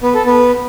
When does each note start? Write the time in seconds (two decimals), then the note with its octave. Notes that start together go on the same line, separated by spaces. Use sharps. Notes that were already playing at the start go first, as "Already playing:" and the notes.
0.03 B3
0.14 A4
0.26 B3